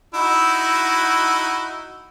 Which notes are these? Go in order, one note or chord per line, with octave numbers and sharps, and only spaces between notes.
D#4 E4 F#4